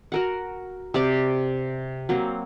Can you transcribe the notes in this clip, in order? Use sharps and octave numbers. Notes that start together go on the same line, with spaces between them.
F#4 A#4 F#5
C3 G4 D5
F#3 A#3 C4